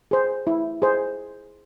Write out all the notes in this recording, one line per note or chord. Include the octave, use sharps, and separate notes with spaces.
G#4 C5
E4
G#4 C5